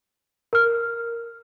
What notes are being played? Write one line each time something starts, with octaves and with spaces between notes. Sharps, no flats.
A#4 F6